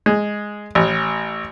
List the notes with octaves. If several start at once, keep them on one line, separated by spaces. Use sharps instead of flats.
G#3
A1